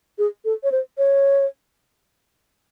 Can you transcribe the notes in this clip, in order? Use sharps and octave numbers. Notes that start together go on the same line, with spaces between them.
G#4
A4
C#5
C5
C#5